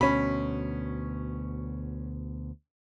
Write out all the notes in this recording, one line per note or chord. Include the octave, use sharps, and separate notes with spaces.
D2 B2 C#4 B5